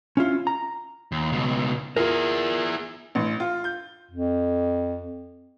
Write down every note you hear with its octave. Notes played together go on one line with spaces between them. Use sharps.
C#4 E4 F4
A#5
D#2
C#2 B2
E4 F4 G#4 A#4
A1
F4
G6
F2